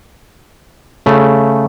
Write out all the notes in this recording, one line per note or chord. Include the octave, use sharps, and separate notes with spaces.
C#3 A3